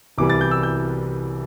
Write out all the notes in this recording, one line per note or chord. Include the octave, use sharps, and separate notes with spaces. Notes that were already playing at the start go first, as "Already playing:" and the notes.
C2 C3 E3 G3 D6
A6
G6
E6
G6